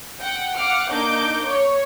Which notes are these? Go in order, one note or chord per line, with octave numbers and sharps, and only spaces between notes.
F#5 G5
F5 F#5 D6 F6
A#3 D4 D#4 D6 G6
C#5